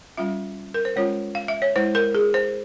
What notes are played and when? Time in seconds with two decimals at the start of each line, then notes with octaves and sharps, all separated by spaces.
0.17 G3 C#4 F4 E5
0.74 A#4
0.85 C5
0.96 G#3 C#4 F4 C#5
1.35 F5
1.48 E5
1.62 C#5
1.76 G#3 E4 C5
1.95 A#4
2.15 G#4
2.34 C5